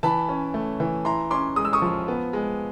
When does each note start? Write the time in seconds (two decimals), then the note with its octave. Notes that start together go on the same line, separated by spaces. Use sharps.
0.03 E3 A5 B5
0.29 C#4
0.54 A3
0.80 E3
1.05 E4 A#5 C6
1.31 C#4 C6 D6
1.56 G#3 D#6
1.65 E6
1.73 C#6 D#6
1.82 F3
2.08 B3
2.33 G#3